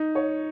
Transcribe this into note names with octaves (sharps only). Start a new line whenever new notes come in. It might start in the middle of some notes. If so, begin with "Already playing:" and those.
Already playing: D#4
C#5